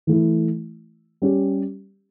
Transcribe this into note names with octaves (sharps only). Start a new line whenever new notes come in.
E3 A3 E4
G3 C#4 G4